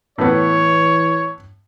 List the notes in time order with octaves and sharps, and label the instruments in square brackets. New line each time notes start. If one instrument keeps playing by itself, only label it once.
[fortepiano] A2 B3 [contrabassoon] E3 [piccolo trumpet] C#5